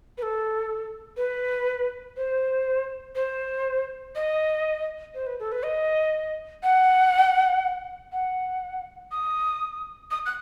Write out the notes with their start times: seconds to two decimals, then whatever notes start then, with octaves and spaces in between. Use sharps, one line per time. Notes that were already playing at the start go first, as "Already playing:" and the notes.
0.18 B4
0.22 A4
1.17 B4
2.16 C5
3.15 C5
4.15 D#5
5.14 C5
5.26 B4
5.39 A4
5.52 B4
5.63 D#5
6.63 F#5
8.12 F#5
9.12 D#6
10.11 D#6
10.26 F#6